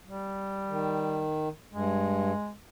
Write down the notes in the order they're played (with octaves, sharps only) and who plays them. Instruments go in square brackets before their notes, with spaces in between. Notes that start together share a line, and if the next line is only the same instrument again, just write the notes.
[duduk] G3
[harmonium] D#3
[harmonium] G2 [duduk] G#3